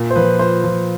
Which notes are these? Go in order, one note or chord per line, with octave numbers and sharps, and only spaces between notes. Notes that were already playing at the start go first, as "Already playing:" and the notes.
Already playing: A#2
C5
F3 B4
F3 C5
F3